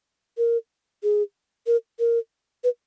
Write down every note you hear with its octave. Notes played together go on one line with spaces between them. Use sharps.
A#4
G#4
A#4
A#4
B4